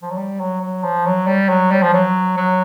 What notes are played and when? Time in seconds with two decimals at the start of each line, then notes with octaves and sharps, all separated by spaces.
0.03 F3
0.10 F#3
0.18 G3
0.40 F#3
0.61 F#3
0.83 F3
1.06 F#3
1.27 G3
1.49 F#3
1.71 G3
1.82 F3
1.93 F#3
2.37 F#3